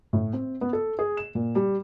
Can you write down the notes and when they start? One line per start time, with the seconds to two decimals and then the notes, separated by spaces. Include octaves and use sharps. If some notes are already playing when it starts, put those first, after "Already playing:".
0.13 A2
0.33 C4
0.61 B3
0.73 A4
0.99 G#4
1.17 E7
1.35 A#2
1.55 G3